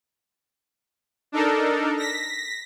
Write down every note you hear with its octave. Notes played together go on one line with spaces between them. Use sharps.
D4 D#4 A4 A#4
A#6 B6